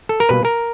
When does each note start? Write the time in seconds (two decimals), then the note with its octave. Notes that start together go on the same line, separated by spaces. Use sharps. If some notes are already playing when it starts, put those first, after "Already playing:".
0.09 A4
0.20 A#4
0.29 B2 G3 A#3 B4
0.45 A#4